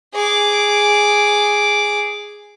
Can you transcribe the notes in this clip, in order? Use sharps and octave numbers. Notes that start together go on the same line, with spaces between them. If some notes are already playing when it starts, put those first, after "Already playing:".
G#4 D6